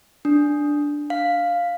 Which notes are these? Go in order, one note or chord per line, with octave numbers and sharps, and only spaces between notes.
D4
F5